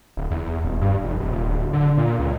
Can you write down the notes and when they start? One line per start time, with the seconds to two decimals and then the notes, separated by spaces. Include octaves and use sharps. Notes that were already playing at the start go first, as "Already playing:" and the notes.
0.17 D1
0.31 E2
0.65 D#1
0.81 G2
1.04 F1
1.20 D#1
1.31 D#1
1.49 D1
1.73 D3
1.98 A#2
2.19 C#2